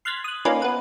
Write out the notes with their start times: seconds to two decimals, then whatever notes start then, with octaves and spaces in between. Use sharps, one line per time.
0.05 C6 F6 F#6 G#6 A6 B6
0.24 D#6 F#6
0.45 A#3 C#4 D#4 F4 B4 D5
0.62 B3 B4